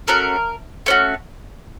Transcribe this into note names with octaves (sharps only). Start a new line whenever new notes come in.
A3 C#4 F#4 A#4
A3 C#4 F#4